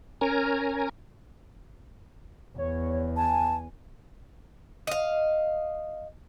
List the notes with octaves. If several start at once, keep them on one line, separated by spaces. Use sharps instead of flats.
C#4 A#4 G#5 A#5
E2 C#5
G#5 A5
D#5 F5